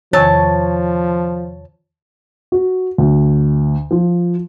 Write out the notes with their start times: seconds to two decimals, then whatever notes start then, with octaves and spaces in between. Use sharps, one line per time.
0.13 E2 C3 D#3 F3 C#5 A5
2.52 F#4
2.98 D2
3.91 F3